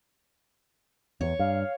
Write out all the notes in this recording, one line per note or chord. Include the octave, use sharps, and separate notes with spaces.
E2 C#5
G2 F5